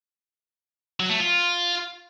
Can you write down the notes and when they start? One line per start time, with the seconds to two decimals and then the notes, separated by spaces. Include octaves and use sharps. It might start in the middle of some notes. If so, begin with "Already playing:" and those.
1.00 F#3
1.09 A3
1.19 F4